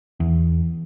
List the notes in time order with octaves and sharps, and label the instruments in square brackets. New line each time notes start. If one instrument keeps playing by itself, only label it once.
[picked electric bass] E2